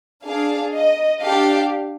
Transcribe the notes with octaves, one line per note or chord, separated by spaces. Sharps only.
D4 G#4 F5
D#5
D4 G4 F5